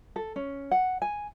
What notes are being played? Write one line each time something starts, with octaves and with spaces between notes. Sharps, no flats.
A4
C#4
F#5
G#5